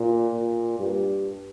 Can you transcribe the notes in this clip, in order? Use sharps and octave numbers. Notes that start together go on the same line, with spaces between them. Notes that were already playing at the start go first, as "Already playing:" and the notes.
Already playing: A#2
A#2
G2